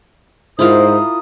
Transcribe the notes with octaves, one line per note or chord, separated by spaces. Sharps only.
G#2 E4 F4 A#4 C5 D#6